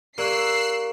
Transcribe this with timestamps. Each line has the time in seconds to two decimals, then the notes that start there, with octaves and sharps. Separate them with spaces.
0.18 A#3 G4 D5 C#6 E6 F#6 C7